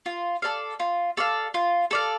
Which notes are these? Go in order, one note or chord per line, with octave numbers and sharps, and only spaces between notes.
F4
A4 D5 F5
F4
A4 D5 F5
F4
A4 D5 F5